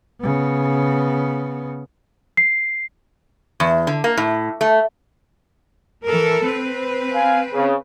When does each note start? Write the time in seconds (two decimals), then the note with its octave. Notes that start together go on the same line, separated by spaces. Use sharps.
0.20 C#3 B3
2.37 C7
3.60 E2
3.87 D3
4.04 A#3
4.17 A2
4.61 A3
6.05 E3 A4 A#4
6.43 C4 B4
7.13 F5 G#5
7.53 C#3